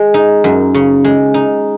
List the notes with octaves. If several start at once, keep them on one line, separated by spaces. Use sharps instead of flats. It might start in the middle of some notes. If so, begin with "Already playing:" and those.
Already playing: G#3
D#4
F#2
C#3
G#3
D#4